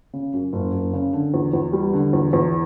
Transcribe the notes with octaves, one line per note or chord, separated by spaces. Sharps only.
C#3
F#2
F#1
F#1
C#3
D3
E2
E2
G3
D3
E2
E2